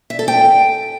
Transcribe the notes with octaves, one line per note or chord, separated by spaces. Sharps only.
E5
A4
G5